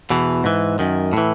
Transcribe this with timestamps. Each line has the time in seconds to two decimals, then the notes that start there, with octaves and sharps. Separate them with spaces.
0.10 E2 B2 E3
0.44 G#2 E3
0.79 F#2 D#3
1.13 A2 E3